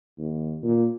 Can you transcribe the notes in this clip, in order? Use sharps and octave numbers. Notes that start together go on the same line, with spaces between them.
D#2
A#2